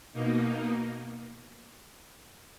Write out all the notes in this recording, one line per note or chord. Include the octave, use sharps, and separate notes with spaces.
B2 A#3 D#4